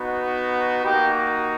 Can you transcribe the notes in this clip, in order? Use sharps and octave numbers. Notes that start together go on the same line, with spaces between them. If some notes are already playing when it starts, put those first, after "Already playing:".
Already playing: B3 D#4 F#4
A#3 D#4 F#4 G4